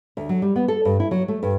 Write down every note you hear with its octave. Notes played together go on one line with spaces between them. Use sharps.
D2
F#3
G3
B3
A4
G2
E4
F#3
A3
G2